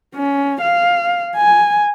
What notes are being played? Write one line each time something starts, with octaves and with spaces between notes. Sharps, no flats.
C#4
F5
G#5